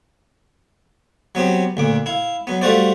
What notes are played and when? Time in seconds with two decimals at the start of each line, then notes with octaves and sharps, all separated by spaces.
1.35 F#3 B3 C4 G4
1.77 D2 A#2 D6
2.06 E4 F5
2.47 F#3 B3
2.61 G3 A3 F4 F#4 C5 D5